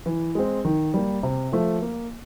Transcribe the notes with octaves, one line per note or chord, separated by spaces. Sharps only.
E3
G#3 C4
D#3
G3 A#3
C3
F3 A3
A#3